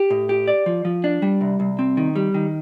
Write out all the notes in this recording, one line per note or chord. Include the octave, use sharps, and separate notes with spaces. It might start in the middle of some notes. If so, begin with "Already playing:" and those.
Already playing: G4
A2
G4
D5
F3
F3
D4
G3
C2
C2
C4
D#3
G3
D#3